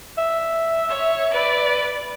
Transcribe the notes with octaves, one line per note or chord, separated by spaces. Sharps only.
E5
C#5
B4 D5